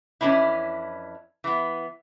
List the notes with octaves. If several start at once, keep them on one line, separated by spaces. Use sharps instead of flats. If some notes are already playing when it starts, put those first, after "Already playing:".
F2 E3 G#3 C#4 D4 E4
E3 B3